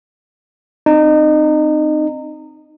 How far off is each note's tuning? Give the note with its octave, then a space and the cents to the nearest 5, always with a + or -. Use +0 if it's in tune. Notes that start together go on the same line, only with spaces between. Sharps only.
C4 +0 D#4 -25